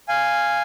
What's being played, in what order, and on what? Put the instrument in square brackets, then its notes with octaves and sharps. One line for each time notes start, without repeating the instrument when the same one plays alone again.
[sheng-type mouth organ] F5 G#5